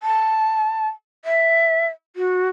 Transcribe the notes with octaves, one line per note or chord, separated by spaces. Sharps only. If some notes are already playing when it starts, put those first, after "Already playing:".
A5
E5
F#4